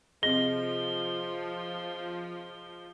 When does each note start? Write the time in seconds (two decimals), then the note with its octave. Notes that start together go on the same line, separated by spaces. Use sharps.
0.23 C3 F3 G#4 D#5 A#6 G7